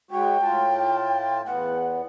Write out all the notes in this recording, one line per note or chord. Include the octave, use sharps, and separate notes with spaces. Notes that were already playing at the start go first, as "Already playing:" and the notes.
G#3 F#4 C#5 G5
A2 F4 A5
E2 B3 F#5